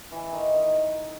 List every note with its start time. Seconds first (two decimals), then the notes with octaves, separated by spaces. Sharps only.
0.12 E3
0.33 D#3
0.54 D#3